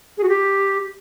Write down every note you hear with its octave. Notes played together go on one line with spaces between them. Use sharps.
G#4
F#4
G4